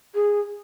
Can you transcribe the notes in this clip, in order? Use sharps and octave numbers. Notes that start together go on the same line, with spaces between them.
G#4